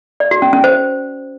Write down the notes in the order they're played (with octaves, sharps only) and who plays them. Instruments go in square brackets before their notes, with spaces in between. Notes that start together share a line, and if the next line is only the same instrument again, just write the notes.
[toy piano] D5
F#4
C#4
C#4
C5